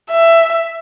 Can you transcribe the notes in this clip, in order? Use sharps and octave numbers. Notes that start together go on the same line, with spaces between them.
E5